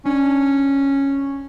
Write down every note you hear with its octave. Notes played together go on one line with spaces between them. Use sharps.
C#4 D4